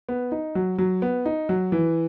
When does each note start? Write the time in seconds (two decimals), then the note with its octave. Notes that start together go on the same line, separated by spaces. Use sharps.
0.09 B3
0.32 D#4
0.55 F#3
0.78 F#3
1.02 B3
1.26 D#4
1.49 F#3
1.72 E3